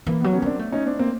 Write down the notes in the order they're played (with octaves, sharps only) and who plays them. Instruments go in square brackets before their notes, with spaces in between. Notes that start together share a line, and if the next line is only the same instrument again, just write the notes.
[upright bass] E3 [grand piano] A#3
[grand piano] B3
[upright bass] F#3
[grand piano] B3 C#4
[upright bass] A#3 [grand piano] C4 D4
[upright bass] A3
[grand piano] C#4 D#4
C4 D4
A#3 C4